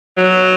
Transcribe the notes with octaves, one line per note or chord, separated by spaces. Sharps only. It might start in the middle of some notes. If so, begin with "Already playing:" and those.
F#3